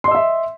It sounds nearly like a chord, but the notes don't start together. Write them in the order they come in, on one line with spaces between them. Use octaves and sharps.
C6 D#5 E6 E5